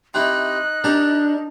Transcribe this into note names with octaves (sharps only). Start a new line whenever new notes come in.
C3 C4 D#4 E4 F#6
D4 G4 A#4 A5